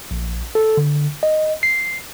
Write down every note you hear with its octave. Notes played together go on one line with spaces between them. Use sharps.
A#1
A4
D3
D#5
C7